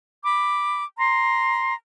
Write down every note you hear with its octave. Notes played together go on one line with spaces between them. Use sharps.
B5 D6
A#5 C6